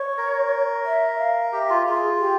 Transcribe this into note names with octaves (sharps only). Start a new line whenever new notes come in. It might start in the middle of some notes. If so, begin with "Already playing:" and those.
Already playing: C#5
A#4
E5
F5
G4 E5
F4
F4 G#4
G4